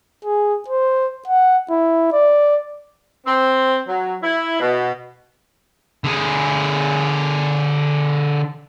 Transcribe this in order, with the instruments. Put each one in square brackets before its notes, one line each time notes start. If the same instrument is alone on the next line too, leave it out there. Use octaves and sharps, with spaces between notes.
[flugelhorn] G#4
C5
F#5
E4
D5
[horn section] C4
F#3
E4
B2
[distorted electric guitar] D3 G#4